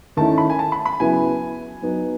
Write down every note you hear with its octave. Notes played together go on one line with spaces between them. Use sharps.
D#3 A3 C#4 E4 A5
B5
G#5
A5
B5
B5
C#3 F#3 B3 E4 G#5
F#3 B3 D#4